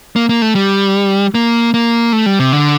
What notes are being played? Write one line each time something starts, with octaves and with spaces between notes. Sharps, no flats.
A#3
A#3
A3
G3
A#3
A#3
A3
G3
C3
D3